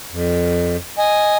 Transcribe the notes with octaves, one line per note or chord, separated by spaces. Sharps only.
F2
D#5 G#5